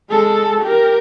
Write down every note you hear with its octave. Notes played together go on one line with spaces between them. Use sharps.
G#3 A4
G4 A#4